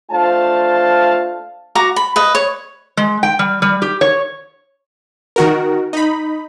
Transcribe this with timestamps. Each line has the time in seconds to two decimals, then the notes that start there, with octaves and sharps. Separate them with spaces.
0.10 A3 D4 F4 C5 F5 A5
1.75 F#4 A#5 D6
1.96 B5
2.16 B4 D#5
2.35 C#5
2.97 G#3
3.23 G5
3.39 G3
3.62 G3
3.82 G4
4.01 C#5
5.36 D#3 F#4 A#4
5.93 D#4 B5